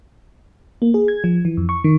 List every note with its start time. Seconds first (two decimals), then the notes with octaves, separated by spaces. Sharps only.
0.82 A#3
0.94 G#4
1.08 G#6
1.24 F3
1.45 E3
1.57 F2
1.69 C#6
1.84 D#3